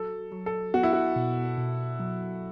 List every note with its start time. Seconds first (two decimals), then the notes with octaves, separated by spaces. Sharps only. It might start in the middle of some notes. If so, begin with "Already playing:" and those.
Already playing: F#3 A4
0.32 F#3
0.46 A4
0.74 B3 F#4
0.83 E4
0.93 F#4
1.16 B2
1.57 B2
2.00 F#3